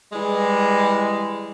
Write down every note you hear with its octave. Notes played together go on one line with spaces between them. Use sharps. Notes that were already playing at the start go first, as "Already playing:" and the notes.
E3 G3 G#3